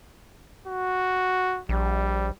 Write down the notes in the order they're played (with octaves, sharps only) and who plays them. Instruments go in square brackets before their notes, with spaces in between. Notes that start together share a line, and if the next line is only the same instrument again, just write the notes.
[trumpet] F#4
[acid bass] A#1 [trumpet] G3